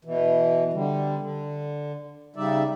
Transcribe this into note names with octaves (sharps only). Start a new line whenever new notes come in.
B2 E3
D3 G3
D3
C#3 G3 D#4 D5 E5